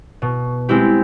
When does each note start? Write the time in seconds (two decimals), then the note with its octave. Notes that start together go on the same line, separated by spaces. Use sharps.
0.22 B2
0.69 G#3 C4 E4 G4